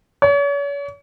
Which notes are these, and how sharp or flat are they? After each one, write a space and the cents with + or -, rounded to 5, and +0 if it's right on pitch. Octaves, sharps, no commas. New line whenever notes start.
C#5 +40